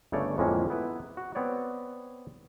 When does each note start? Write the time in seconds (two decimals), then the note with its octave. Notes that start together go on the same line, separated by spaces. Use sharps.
0.12 G1 C#3 A3 C#5 D5
0.38 F2 A2 D3 G#3 A#3 C#4
0.70 B3 E4 B4
1.17 F#4
1.35 B3 C4 C#5 D5